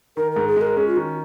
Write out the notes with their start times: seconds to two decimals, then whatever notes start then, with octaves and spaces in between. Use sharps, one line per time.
0.17 D#3 A#4
0.32 G#2 A#4
0.47 G#4
0.56 G#3 A#4
0.77 C#4 G#4
0.87 F4
0.96 D#3 F#4